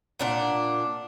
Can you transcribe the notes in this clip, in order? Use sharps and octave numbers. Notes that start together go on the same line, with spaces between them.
A#2 D4 F#5